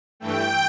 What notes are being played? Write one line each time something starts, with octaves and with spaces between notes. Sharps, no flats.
G2 E3 A3 G5